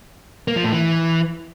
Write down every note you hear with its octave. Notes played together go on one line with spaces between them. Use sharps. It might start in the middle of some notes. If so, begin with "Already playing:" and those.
A#3
F3
A2
E3